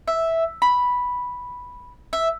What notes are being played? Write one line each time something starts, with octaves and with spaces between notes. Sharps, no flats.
E5
B5
E5